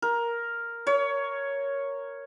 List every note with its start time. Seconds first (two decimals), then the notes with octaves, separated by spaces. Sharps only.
0.02 A#4
0.87 C#5